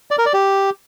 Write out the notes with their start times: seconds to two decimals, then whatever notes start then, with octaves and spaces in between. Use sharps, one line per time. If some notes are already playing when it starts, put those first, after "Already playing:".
0.11 D5
0.18 A#4
0.26 D5
0.34 G4